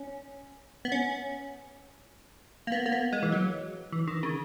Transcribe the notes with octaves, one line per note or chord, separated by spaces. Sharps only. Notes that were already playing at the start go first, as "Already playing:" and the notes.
Already playing: C#4
B3
C#4
A#3
B3
A#3
B3
G#3
E3
F#3
E3
D#3
C#3